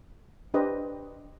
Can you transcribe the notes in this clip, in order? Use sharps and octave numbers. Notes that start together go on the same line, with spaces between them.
D4 G4 B4 C5 D#5